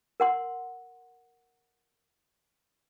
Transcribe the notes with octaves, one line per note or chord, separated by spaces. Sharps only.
A#4 F#5 C6